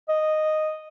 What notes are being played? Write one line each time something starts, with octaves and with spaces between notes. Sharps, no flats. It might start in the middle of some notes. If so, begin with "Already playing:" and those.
D#5